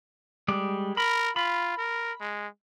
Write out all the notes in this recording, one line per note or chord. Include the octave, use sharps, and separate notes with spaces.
G3 G#3 D5
A#4 B5
F4 B5
A#4
G#3